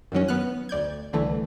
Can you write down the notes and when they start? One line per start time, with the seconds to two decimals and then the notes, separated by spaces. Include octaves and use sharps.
0.12 F#2 D#3 F#3 C#4
0.28 B3 F6 F#6
0.69 D2 D5 G6 G#6
1.13 C2 D3 E3 A3